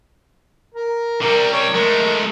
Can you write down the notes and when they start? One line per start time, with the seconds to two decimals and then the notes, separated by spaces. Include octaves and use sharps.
0.75 A#4
1.22 C3 G3 A#4
1.53 C#5
1.75 G#3 A3 A#4